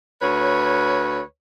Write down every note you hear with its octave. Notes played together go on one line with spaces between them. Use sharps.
D2 B4 C#5